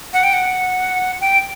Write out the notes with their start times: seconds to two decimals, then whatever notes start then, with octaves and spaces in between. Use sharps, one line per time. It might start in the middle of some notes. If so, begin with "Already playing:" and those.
0.13 F#5
0.24 G5
0.33 F#5
1.21 G5